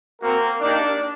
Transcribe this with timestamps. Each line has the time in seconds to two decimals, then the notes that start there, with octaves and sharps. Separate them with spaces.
0.20 A#3 C4 F#4 A#4
0.60 A#3 D4 D#4 G4 D5